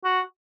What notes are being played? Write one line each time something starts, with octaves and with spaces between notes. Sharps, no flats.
F#4